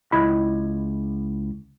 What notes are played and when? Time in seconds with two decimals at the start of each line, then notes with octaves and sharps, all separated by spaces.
0.12 C#2 E4 D#5 B5